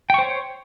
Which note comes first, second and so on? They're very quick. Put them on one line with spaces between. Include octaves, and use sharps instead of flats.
G5 C#6 C5 C#5